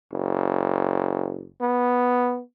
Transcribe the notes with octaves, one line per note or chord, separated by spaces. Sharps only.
F#1
B3